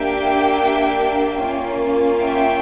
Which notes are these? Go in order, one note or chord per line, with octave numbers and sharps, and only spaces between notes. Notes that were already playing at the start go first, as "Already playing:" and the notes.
Already playing: A#3 D4 G4 E5 G5
A#3 C#4 F4
E5 G5